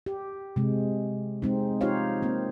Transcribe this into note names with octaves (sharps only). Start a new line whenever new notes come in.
G4
C3 G#3
G#3 C4 D#4
D#4 F4 G4 C5 C#5 F5
A#3 C4